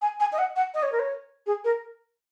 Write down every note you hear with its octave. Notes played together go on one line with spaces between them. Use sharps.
G#5
G#5
D#5
F#5
F#5
D#5
C#5
A#4
C#5
G#4
A#4